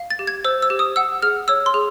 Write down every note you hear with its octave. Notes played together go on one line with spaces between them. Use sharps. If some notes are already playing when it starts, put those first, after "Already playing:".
Already playing: F5
A6
G4
G#6
C5 E6
E6
G4
D#6
F#5 E6
G#4 F6
C#5 E6
C6
G#4